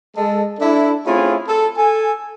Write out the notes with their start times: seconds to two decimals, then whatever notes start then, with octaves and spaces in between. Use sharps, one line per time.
0.16 G#3 A4
0.59 D4 E4 A4
1.06 A3 C4 C#4 E4 F4 G#4
1.47 A4
1.77 A4 G#5